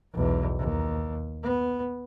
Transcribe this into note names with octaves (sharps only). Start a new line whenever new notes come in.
B1 E2
D#2
B3